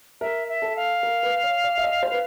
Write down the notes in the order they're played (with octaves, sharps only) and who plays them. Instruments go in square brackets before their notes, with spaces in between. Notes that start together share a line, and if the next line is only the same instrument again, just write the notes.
[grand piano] A#4 [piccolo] E5
[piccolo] E5
[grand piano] A4
[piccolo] F5
[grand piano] A#4
B4
C#5
D5
E5
D#5
C5
B4